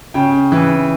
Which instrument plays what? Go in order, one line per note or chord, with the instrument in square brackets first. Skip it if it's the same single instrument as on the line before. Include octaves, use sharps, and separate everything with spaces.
[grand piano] C#3 G5
E3